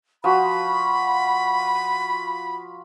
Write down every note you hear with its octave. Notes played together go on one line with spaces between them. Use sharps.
F3 F#4 B5